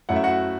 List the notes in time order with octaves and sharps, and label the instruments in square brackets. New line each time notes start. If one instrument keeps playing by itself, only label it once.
[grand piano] F#2 F#3 A3 E4 F#5
E5
F#4 F#5